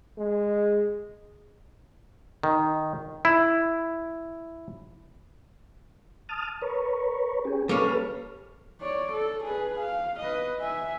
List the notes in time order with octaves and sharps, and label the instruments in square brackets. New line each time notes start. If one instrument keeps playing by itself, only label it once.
[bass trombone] G#3
[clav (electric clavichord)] D#3
E4
[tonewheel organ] A5 D#6 F6
A#4 B4 C#5
C#4 G4 G#4
[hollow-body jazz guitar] G3 A#3 C#4 [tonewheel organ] A4 B4 F6
[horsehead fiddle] C#5 D5
A4
G#4 B4
F5
B4 D#5
E5 G#5